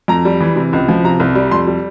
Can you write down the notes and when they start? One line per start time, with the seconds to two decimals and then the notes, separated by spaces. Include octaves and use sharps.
0.08 F2 A#5
0.25 G3
0.41 E3
0.56 C3
0.73 C#2
0.88 F3
1.04 C3 A#5
1.20 C2
1.35 G3
1.51 F2 C6
1.67 G3